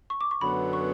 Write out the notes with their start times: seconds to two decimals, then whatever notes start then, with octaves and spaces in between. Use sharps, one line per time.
0.10 C#6
0.21 D6
0.31 C#6
0.41 F#2 D3 F#3 B3 B5
0.73 C#6